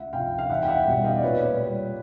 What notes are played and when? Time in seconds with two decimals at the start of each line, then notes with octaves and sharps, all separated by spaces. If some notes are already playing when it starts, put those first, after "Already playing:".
Already playing: C#2 E5 F#5
0.13 C3 F3 F5 G5
0.38 F5
0.49 E2 E5 F#5
0.62 G5
0.68 E5 F#5
0.86 B2 G3
1.04 D#5 F5
1.16 D5
1.22 A#2 B4 C#5
1.59 G3